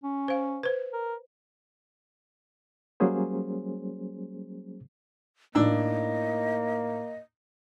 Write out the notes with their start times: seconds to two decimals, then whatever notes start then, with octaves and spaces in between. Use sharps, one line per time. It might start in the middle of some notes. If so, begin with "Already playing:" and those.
0.04 C#4
0.28 C5 F5
0.63 B4 C5
0.93 A#4
3.00 F#3 G3 A#3 C#4 G#4 C5
5.55 A2 A#3 D4 D#4 D#5 E6